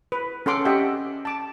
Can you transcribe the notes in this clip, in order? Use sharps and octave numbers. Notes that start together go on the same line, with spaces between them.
B4
C#4 A4 F#5 C6 D6
G4 D#5 E5 F#5 G5
A5 D6